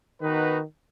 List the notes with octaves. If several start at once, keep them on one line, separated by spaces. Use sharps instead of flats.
D#3 B3 D#4 F#4 B4